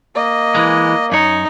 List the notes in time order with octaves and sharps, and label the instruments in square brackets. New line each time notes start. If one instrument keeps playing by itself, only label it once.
[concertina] A#3 [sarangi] D#5
[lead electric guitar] E3 G#3
[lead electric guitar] F#2 C#5 [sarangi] D#4